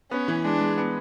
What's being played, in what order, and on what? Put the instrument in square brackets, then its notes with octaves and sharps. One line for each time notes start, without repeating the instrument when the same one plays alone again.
[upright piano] B3 [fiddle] C#4
[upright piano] E3
[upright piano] G#3 [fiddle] D4
[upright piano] G#3
B3